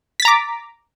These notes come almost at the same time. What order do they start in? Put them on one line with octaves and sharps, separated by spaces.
B6 A6 A#5 D6